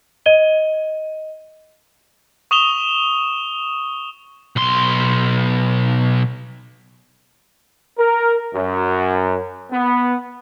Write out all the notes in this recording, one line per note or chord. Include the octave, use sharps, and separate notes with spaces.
D#5 D#7 G7
C#6 D#6 E7 F7 G7
B1 C6
A#4
F#2
B3